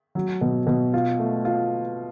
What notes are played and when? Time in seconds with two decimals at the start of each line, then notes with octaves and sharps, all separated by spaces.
0.15 F#3
0.41 B2
0.67 B2
0.94 F4
1.19 A3
1.45 F4